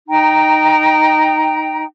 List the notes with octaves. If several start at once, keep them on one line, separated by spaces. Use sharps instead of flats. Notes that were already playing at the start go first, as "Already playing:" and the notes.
D#4 G5 A#5